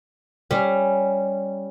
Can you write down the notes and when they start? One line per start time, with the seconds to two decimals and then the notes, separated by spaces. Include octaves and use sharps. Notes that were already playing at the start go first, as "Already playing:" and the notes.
0.51 G3 C#4